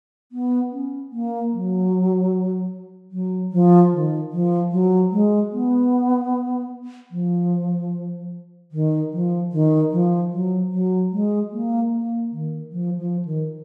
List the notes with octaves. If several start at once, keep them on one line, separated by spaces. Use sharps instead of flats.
B3
C#4
A#3
F#3
F#3
F3
D#3
F3
F#3
G#3
B3
F3
D#3
F3
D#3
F3
F#3
F#3
G#3
A#3
A#3
D#3
F3
F3
D#3